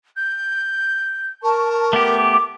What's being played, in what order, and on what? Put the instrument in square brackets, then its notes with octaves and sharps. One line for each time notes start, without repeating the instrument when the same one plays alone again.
[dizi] G6
[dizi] A#4 [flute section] A5 C#6
[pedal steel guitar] A3 B3 G4 [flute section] D6